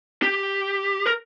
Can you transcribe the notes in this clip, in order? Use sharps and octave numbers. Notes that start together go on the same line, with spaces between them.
G4
A#4